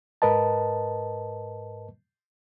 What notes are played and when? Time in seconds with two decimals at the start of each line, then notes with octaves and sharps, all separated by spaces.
0.22 G#2 A#4 B4 D#5 A5